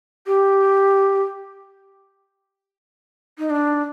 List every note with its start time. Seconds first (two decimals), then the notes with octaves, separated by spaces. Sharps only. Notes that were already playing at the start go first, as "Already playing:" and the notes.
0.27 G4
3.39 D#4
3.50 D4